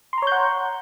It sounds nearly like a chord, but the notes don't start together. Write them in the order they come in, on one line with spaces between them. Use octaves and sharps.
C6 A#5 C#5 G6 F#5